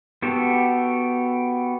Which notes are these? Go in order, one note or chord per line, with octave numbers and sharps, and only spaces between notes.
B3 F#4 G4 A4